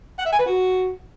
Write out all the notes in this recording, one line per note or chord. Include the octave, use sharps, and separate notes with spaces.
F#5
E5
G#5
B4
F#4